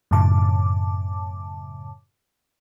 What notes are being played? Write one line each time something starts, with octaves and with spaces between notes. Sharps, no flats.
F#2 A2 C#3 A5 D6